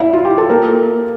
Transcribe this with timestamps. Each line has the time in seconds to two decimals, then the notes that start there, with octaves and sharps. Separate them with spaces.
0.00 E4
0.13 F4
0.25 G4
0.38 A4
0.49 A#3 A#4